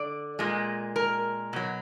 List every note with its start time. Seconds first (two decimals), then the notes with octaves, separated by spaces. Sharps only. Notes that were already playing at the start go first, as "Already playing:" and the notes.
Already playing: D3 D5
0.39 A#2 G#3
0.96 A#4
1.53 B2 F#3